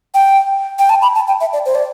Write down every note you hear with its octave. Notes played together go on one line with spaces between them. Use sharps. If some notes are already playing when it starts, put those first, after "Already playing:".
G5
G5
A5
B5
A5
G5
E5
D5
C5
D5